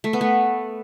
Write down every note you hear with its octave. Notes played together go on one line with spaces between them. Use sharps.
A3
B3
A3